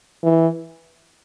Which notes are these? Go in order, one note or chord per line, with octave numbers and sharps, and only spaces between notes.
E3